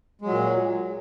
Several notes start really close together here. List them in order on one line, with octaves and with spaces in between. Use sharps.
G#3 F#3 A#2